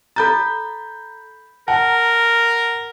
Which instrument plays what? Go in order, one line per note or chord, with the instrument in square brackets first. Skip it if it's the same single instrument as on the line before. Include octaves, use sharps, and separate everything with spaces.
[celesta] A4 A#5 [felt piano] B5 G6 A6
[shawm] A#4 [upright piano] F#5 A#5 [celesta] A5